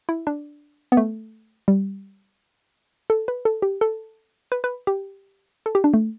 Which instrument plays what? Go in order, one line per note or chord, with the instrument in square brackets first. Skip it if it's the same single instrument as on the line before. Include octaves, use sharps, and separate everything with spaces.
[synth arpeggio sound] E4
D4
B3
A3
G3
A4
B4
A4
G4
A4
B4
B4
G4
A4
G4
D4
A3